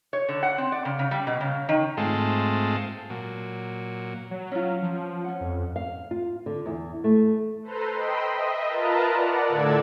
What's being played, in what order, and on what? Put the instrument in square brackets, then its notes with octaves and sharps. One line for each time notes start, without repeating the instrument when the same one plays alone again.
[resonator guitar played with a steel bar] C#5
D3
F#5
C4
D5
C#3
C#3
G3
B2
C#3
D#3
[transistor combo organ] G#2 G#3 A3 C4 F4 A4
A#2 F#3
[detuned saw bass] F#3
[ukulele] C#4 F4
[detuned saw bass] F3
[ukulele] C#4 F#5
[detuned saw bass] F2
[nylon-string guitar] F5
F4
D3
E2
A3
[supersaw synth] A4 B4 C5 A#5 C6
D#5 G5 B5 C6 E6
D#5 E5
F4 A#4 B4 A5 A#5
D5 F#5
A2 D3 A4 D5 E6 G#6